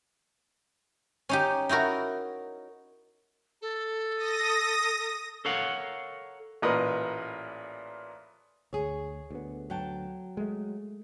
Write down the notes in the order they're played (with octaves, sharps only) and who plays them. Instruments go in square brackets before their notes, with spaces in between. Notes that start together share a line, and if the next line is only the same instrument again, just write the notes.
[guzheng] C#4 D#4 G4
D#4 E4 F#4 A#4
[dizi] A4
[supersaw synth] D#6 A#6
[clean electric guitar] A4 A#4 C#5 F5 F#5
[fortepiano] A1 A#2 A#4 B4 D#5
[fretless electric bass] D2 [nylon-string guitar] G#4 C#5
[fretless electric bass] D2 B3
[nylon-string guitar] F#3 G5 A5
[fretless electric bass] G#3 A3